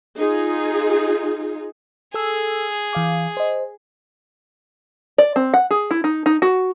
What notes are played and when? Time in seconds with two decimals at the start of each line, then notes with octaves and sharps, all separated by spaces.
0.16 D#4 F4 G#4
2.14 G#4 A4 E6
2.93 E3 F5 D6
3.37 C5 D#5
5.18 D5
5.36 C4
5.54 F#5
5.71 G#4
5.91 E4
6.04 D#4
6.26 D#4
6.42 F#4